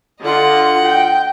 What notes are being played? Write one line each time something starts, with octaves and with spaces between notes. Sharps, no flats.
D3 F4 D#5 F#5
G5